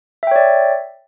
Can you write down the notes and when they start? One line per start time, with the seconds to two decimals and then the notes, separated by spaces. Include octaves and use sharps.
0.23 E5
0.27 G5
0.31 C#5
0.36 D5